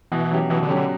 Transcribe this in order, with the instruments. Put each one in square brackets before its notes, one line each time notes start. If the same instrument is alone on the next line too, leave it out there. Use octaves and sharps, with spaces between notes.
[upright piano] B2 [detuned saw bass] E3
[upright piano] F#3 C#4 G4
[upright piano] B2 [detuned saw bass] E3
[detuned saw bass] D3
[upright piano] F#3 C#4 G4
[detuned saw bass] D3